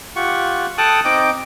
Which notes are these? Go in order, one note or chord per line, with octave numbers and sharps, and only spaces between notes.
F4 G4 F#5 C#6
A4 G5 A5 D#6 F#6
C4 D#4 D#5 G5 D6